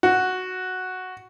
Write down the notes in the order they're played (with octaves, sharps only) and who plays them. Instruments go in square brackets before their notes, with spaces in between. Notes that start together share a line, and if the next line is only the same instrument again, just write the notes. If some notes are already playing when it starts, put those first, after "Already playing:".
[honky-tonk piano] F#4